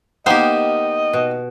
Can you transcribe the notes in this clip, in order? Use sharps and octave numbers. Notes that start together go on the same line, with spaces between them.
D#3 A#3 B3 G4 C5 D#5
B2